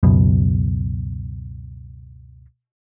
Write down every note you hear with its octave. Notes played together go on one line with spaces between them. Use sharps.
C#2 F#2 B2